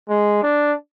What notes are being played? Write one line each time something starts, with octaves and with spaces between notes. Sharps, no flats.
G#3
D4